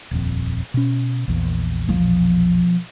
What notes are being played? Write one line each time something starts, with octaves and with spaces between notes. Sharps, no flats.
D#1 A#1 F2
B2 C#4
A#1 E2
B2 F3